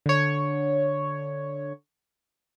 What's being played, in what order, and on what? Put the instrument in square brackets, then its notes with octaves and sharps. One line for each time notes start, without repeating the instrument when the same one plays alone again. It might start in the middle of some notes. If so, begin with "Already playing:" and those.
[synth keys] D3 C#5